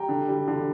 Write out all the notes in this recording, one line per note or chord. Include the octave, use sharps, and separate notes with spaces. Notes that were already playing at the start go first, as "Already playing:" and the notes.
Already playing: G3 G5 A#5
D3
G3
D3